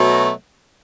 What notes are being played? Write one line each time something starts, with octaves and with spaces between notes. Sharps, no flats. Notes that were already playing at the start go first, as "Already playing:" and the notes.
Already playing: B2 F#3 A3